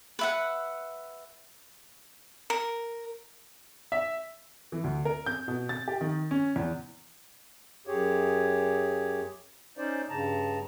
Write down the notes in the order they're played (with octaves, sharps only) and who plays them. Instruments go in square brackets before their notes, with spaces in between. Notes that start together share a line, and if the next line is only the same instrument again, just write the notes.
[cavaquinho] B4 E5 F#5
A#4
[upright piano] E5
E3
D2
A#4
G6
B2
A6
G4
D#3
C#4
E2
[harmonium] F#2 G4 G#4 C#5
C#4 D#4 C5 D5
G2 C#3 A5 A#5